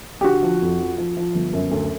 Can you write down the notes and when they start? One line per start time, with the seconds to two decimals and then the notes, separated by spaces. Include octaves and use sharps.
0.21 G4
0.24 D3 F#4
0.43 F3
0.62 F2
0.80 F3
0.98 F3
1.17 F3
1.35 G1
1.53 F#2
1.71 D2